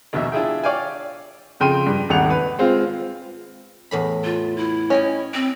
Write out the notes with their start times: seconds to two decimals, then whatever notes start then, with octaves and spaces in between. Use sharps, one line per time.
0.13 A#1 D#2 B2 E5
0.32 D4 E4 F4 G#4 E5 G5
0.64 C#5 D5 F5 G5 G#5
1.60 F2 C#3 G5 C6 D#7
1.86 G2
2.09 D#1 G#1 F#5 F7
2.30 B4
2.58 G#3 C4 F4
3.91 E2 A2 B5
4.24 F4
4.57 E4
4.90 C#4 D#5 G5 G#5
5.34 C4